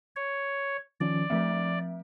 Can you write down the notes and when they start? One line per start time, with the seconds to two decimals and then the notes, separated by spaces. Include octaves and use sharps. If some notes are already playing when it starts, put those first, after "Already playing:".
0.16 C#5
1.00 D#3 F3 C#4 D5
1.30 F3 A3 C4 E5